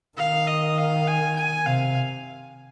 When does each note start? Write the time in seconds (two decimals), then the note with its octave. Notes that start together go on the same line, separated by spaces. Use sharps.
0.18 D#3 F5
0.47 D#5
0.78 F5
1.07 G#5
1.36 G#5
1.66 C3 F5